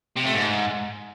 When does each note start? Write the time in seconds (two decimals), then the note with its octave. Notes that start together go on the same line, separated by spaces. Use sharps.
0.16 C3
0.25 A3
0.34 G#2